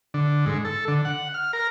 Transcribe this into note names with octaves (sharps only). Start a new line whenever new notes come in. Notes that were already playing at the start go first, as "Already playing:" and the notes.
D3
G#2
A4
D3
F#5
F6
A#4